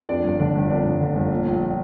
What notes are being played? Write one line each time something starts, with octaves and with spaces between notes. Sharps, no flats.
F2 D4 D5
G1
D3 D4 D5
G1
F2 D4 D5
G1
D3
G1
A#2
A#1